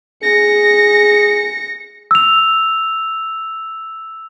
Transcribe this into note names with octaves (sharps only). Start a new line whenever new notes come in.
G#4 A#6 C#7
E6 F7